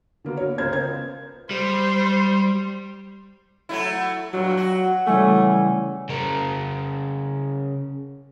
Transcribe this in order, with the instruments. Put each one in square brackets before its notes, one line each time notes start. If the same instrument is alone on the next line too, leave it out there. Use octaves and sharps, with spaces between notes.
[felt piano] D3 A#3 B3 F#4
A#4 C#5
C#2 F4 A#4 C5 G#6
B3 G#6
[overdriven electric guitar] G3 [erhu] C5
[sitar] F#3 A3 E4
[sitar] G2 A#2 [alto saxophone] F#3
[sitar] F#4
[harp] C#3 E3 G3 [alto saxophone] A3 [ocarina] G#5
[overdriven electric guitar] C#3 A#4